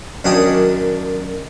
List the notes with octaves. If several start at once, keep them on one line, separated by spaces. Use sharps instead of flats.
F#2 D#3 D4 F#4 D#5 G#5